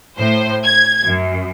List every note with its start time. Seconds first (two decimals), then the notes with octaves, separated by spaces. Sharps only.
0.18 A2 C5
0.65 G#6
1.03 F#2